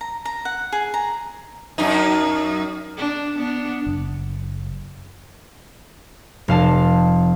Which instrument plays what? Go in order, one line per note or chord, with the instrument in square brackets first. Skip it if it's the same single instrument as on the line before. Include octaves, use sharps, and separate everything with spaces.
[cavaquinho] A#5
A#5
F#5
G#4
A#5
[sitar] F#2 D#4
[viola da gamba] D4
B3 D4
[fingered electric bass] F#1
[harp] F1 F5 A5